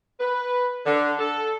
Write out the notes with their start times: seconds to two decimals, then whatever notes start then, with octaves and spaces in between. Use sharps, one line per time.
0.19 B4
0.85 D3
1.19 A4